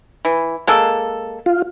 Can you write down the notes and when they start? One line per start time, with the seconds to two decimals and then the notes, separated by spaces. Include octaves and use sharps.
0.25 E3
0.67 G#3 A#3 A4
1.46 F4